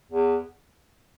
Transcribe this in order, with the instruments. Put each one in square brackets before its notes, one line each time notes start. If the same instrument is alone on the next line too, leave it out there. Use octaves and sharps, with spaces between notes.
[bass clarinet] E2